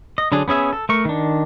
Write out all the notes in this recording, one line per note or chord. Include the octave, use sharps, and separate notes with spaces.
D#5
D3 F#3 D4 G#4
B3 C#4 G#4 E5
A4
A3 A#4 C#6
D#3 D4